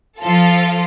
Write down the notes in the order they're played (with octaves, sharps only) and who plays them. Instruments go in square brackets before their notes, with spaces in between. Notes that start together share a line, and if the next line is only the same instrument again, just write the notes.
[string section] F3 F4 A4